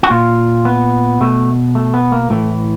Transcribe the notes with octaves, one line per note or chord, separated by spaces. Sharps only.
F#4
A#2 F4
B3
B2 A3
A3
B3
A#3
A2 E3 A3